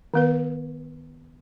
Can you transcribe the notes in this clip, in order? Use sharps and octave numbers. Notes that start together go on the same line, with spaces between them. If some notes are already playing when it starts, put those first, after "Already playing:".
D#3 B3 B4